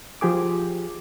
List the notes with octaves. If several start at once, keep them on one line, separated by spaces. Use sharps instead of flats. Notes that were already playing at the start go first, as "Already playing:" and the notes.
F3 G4 G#4 D6